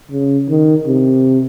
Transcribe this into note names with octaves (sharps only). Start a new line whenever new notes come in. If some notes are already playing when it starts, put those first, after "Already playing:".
C#3
D#3
C3